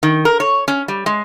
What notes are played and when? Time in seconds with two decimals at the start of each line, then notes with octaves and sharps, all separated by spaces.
0.03 D#3
0.25 A#4
0.40 C#5
0.68 C#4
0.88 G3
1.06 G#3